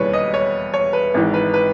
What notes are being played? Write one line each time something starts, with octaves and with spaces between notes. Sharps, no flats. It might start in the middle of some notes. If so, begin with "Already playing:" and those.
Already playing: E1 D#2 C#3 E3 G3 B4 C#5
D#5
C#5
C#5
B4
G#1 G#2 E3
B4
B4